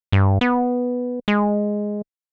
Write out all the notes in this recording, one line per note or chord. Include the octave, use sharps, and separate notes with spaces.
G2
B3
G#3